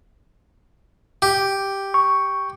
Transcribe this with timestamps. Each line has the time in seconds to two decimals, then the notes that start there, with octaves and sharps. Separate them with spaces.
1.22 G4
1.94 C#6